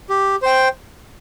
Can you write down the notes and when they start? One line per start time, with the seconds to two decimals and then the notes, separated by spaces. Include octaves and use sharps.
0.09 G4
0.42 C5 G5